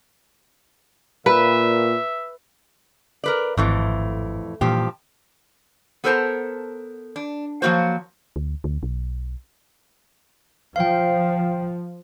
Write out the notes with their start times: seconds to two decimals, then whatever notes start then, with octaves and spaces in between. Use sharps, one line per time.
1.26 A#2 B4 E5
3.24 A#4 B4 D5
3.57 G#1 F2 A2 E3
4.61 G2 A#2 E3 F3 G4
6.04 B3 A4 A#4 C5 A5 A#5
7.16 D4
7.62 F3 F#3 A#3 F#4 C5
8.36 D2
8.64 D2
8.83 B1
10.76 F3 F5 G5